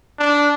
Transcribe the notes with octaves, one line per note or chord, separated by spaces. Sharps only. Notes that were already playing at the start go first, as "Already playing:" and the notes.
D4